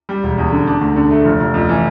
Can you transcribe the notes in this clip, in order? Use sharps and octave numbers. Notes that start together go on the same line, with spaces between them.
G3
E1
E2
D3
D4
D2
D3
A3
F1
F1
F2
E3